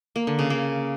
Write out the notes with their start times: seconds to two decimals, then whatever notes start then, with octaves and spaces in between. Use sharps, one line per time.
0.16 A#3
0.27 D3
0.39 C#3
0.50 A#3